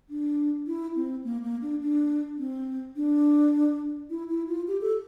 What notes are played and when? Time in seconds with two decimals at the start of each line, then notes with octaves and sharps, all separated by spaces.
0.10 D4
0.67 E4
0.96 C4
1.24 A#3
1.43 A#3
1.62 D4
1.82 D4
2.38 C4
2.96 D4
4.10 E4
4.29 E4
4.48 F4
4.68 G4
4.81 A4